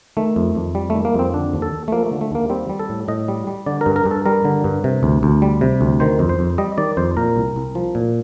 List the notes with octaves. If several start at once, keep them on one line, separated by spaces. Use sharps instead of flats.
D#3 A3
F2
F2
G3
A3
D#3
A#3
F2 C4
D3 D4
D#2
A4
D#2
A3
F3 A#3
A3
D3
A3
D#2 A#3
G3 C4
G3
A4
A2
A2 D#5
G3
G3
D3 D5
A#4
G2
A#4
G2
A4
G3 A#4
D3
G2
C3
D2
D2
G3
C3
D2
D#3 C5
F2
C5
F2
G3 D#5
D#3 D5
F2 C5
A#2 A#4
C2
C2
F3
A#2